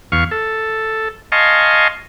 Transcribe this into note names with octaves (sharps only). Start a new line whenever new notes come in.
E2 F5 C#6
A4
D#5 F5 G#5 A5 C6 C#6